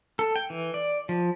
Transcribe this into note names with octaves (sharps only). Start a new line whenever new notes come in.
A4
G5
E3
D5
F3